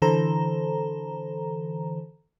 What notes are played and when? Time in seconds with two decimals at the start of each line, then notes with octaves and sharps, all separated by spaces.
0.02 D3 E3 A4 C5 A#5